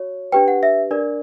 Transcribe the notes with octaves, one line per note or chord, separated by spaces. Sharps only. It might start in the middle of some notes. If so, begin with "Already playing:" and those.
Already playing: F#4 C#5
D4 G4 B4 G5
F#5
E5
D4 A#4 D5